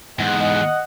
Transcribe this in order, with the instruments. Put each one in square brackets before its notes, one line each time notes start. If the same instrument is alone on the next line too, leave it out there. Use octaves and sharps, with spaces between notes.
[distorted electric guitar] E2 G#2 [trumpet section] D#5 F#5